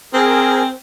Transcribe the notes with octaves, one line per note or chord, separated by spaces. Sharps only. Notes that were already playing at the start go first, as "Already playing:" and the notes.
C4 G#4 A#4